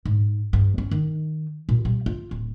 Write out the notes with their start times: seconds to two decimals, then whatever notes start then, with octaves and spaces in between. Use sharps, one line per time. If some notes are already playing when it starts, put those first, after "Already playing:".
0.05 G#2
0.53 G2
0.78 C#4
0.91 D#3
1.69 A#2
1.85 G3
2.06 F4
2.31 D1